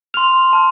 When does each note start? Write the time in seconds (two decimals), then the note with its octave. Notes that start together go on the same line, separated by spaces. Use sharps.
0.14 C6 F6 F7
0.53 A5 F6